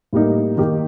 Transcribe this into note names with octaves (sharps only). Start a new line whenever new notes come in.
A2 G3 A#3 D#4
D#3 A#3 D#4 G4